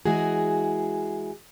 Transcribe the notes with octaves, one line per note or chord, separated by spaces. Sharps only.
E3 G#3 F#4 G#4